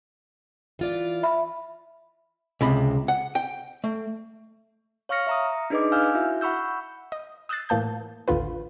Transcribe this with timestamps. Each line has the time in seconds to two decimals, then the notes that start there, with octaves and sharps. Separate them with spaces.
0.79 E3 F4 D5
1.23 E5 B5
2.61 C#2 C3 B5
3.08 F#5
3.35 G5
3.84 A3
5.09 C#5 F5 C#6 F6 A#6 C#7
5.27 E5 A#5 D#6
5.70 D4 D#4 G#4 B4 D#5 D6
5.92 F5 G#5 E6 F6 G6
6.15 E4 F#4 E5
6.41 F#5 B5 C#6 E6 G6
7.12 D#5
7.49 D#6 E6 F#6 G6 A6 C7
7.69 A2 E3 A#3 A5 G6
8.28 A1 D#2 D3 F4 B4